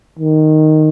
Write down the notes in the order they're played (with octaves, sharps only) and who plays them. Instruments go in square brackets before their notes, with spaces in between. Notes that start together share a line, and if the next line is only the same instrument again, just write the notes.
[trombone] D#3